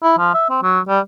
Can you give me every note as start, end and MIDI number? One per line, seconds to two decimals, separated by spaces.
0.03 0.13 64
0.18 0.34 53
0.34 0.47 76
0.50 0.60 60
0.63 0.80 54
0.88 0.99 55